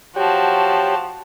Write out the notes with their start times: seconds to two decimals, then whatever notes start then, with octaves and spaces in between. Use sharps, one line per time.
0.16 F3 F#4 G4 C#5 G5 A5